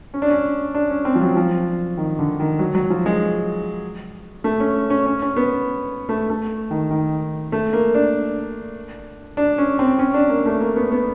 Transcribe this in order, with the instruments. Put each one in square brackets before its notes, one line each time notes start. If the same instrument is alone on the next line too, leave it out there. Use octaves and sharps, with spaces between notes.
[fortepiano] C#4
D4
C#4
D4
C#4
C4
F3
F#3
F3
D#3
D3
D#3
F#3
F#3
F3
G#3
A3
C#4
C#4
C#4
C#4
B3
A3
A3
D#3
D#3
A3
A#3
D4
D4
C#4
C4
C#4
D4
A#3
A3
A#3
B3
B3